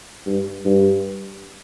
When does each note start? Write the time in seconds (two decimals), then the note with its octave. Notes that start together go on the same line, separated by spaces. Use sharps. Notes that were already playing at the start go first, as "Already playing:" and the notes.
0.26 G2
0.65 G2